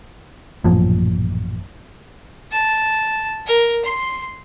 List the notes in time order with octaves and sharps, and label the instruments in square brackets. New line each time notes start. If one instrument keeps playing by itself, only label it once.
[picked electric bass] A1 F#2 A#2 F3
[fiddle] A5
A#4
C6